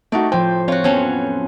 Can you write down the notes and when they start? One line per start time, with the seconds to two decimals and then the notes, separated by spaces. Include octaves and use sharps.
0.12 A3 D#4 F#4 D5
0.32 A2 F3 C5 G5
0.68 C4 F4 F#4 C#5
0.84 F2 F#3 B3 C#4